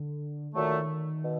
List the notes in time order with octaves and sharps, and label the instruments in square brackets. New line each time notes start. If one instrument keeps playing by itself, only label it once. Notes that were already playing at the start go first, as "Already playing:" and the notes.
Already playing: [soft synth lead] D3
[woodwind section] A#2 F#3 A3 [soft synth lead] D#3
[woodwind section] B2